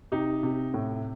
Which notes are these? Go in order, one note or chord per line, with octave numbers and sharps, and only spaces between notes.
C3 D#4 G4
C3
A2